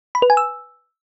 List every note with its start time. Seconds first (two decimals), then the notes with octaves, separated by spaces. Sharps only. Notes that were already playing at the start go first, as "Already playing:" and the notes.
0.15 B5
0.22 B4
0.30 G#5
0.37 E6